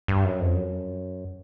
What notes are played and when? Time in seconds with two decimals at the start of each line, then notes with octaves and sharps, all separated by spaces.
0.08 G2
0.24 F#2
0.40 F2
0.55 F#2